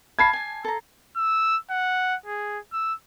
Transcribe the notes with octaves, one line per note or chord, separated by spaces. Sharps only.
F5 A5 B5 G#6 C7
G#5 A5
A4 A#5
E6
F#5
G#4
E6